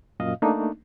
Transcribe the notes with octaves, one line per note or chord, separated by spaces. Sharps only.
F#2 A#2 D#5 F5
A3 A#3 D4 D#4